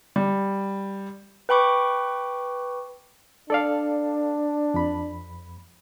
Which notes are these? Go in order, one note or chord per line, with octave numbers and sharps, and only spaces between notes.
G3
B4 G5 B5 C#6 D6
D4 A4 D5 F5
F2 B5